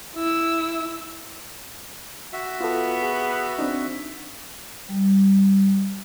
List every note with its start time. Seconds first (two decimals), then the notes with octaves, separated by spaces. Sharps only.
0.15 E4 E6
2.33 F#4 E5
2.61 B3 F4 A4
3.03 G#4
3.59 C4 D4 D#4
4.89 G3